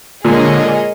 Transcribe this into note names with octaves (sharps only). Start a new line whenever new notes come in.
A#2 D3 G#3 G#4 A#4 C#5 D#5